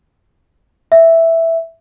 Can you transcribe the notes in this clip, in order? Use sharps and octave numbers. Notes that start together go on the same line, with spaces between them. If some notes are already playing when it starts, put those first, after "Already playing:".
E5